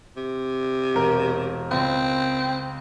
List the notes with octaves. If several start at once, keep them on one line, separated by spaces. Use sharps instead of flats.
C3
E1 A#4
C#2 C4